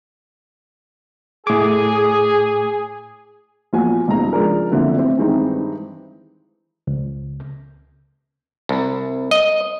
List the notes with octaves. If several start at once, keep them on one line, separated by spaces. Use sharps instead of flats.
A2 G#4 D6
E2 A#2 F3 F4 F#4 G#5
D#1 B1 G#2 A#5
C#3 F3 G#3 D4 A#4
F#2 A#2 D3 F3 C4 E4
A3 C4 E4
G2 D#3 E3 G#3 C4 D#4
C#2
C2
D#5